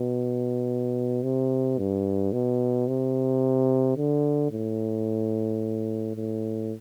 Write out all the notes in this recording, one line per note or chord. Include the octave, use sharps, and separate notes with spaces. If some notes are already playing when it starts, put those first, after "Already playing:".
Already playing: B2
C3
G2
B2
C3
D3
A2
A2